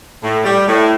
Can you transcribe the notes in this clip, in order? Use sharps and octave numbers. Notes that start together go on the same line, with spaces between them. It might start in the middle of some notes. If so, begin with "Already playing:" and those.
A2
G3
A2